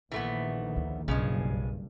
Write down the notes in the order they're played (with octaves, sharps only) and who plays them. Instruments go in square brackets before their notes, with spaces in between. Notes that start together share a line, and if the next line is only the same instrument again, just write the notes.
[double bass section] A#1 D#3 [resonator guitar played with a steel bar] E3 A3 B3
[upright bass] D2
[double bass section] F#1 G2 [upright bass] B1 [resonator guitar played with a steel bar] C#3 F3 G#3